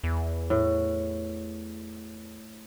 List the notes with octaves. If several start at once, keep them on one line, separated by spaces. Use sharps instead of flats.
E2
A2